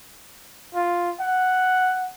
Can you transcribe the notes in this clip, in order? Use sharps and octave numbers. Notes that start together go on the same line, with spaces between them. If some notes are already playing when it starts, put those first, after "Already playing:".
F4
F#5